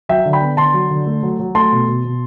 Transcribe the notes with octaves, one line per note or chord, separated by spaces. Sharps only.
F#3 E5 G5
D3
G5 B5
B3
D3 A5 C6
F#3
D3
A3
F#3
F#3
A3 A5 C6
B2
B2
B2